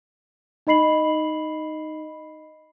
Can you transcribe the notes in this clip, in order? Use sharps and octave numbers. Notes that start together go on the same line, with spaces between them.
D#4 D#5 B5 C7 F#7